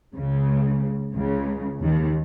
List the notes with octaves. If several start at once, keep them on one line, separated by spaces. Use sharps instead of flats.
C#2 C#3
C#2 C#3
D#2 D#3